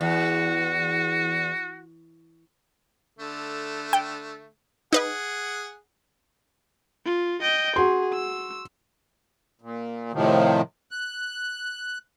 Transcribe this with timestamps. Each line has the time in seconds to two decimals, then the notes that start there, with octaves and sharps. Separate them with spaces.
0.01 E2 F#4
3.19 D3 A3
3.93 G5
4.93 D#4 G#4 B4 D#5 F#5
7.06 F4
7.42 D#5 G5
7.76 F#4 G#4 C6
8.13 E6
9.62 A#2
10.13 A2 C3 D#3 F3
10.91 F#6